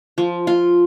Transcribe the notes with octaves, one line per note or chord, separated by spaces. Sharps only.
F3
F4